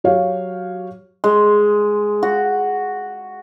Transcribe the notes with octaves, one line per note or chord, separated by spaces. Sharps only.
F#3 F#4 G4 C#5 F5
G#3
F#4